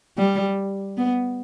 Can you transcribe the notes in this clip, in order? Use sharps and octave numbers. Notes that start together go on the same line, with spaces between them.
G3
B3